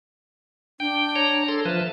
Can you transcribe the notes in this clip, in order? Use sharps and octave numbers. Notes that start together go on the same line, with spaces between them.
D4 G5
C#5 A#5
A4 C6
F3 B4 E5 A5